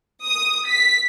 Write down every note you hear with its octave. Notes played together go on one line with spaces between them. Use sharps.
D#6
B6